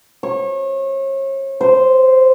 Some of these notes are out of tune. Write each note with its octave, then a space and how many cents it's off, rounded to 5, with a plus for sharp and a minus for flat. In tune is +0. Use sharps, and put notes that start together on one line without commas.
C#5 -35
C5 -10